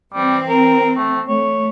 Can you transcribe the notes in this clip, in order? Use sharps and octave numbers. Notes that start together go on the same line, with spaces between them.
E3 G3 C4
A#4
A3
A3 C#5